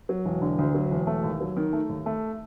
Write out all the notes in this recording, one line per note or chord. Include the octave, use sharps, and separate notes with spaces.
F#3
E1
D3
D2
F#3
E1
A3
D#2
F#3
D#3
A3
D#2
A3